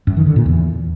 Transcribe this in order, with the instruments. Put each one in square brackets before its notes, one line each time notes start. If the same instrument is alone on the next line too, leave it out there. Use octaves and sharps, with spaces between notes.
[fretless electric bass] F#2
D#3
D3
A#2
E2